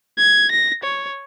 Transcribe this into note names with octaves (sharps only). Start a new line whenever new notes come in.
G#6
A#6
C#5